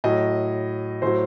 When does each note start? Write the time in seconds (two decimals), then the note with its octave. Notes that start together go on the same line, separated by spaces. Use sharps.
0.04 A2 F#3 D#5
1.02 A2 F#3 C5